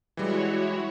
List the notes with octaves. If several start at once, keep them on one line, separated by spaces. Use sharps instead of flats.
E3 G3 G#3 E4 F#4 C#5